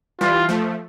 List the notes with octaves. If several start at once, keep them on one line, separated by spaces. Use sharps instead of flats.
E3 G3 F4
F3 A3